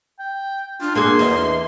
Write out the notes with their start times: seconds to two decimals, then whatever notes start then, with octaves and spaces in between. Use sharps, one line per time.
0.19 G5
0.81 D4 F4
0.95 A#3 F#4 G#4 C6
1.19 E2 D#5